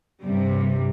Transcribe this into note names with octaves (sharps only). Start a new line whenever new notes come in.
G2 C3 G3